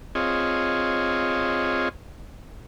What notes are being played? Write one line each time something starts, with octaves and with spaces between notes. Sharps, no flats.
C4 F4 G#4 C#5 D#5